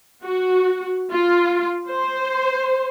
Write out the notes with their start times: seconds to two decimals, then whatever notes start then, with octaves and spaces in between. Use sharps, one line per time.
0.22 F#4
1.10 F4
1.89 C5